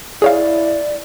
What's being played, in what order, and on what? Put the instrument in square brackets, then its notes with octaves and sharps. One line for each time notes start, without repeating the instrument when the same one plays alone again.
[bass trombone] E4 [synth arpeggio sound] G#4 C#5 F5 [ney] D5